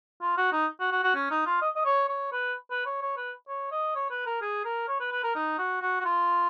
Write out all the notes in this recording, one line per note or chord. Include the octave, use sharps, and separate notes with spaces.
F4
F#4
D#4
F#4
F#4
F#4
C#4
D#4
F4
D#5
D#5
C#5
C#5
B4
B4
C#5
C#5
B4
C#5
D#5
C#5
B4
A#4
G#4
A#4
C#5
B4
B4
A#4
D#4
F#4
F#4
F#4
F4